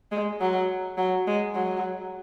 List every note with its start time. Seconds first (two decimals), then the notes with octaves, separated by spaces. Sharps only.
0.11 G#3
0.40 F#3
0.97 F#3
1.27 G#3
1.54 F#3